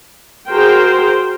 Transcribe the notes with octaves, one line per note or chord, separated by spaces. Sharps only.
F#4 G#4 A#4 C5 G5